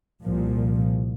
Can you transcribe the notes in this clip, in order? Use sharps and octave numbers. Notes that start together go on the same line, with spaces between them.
C2 A#2 F3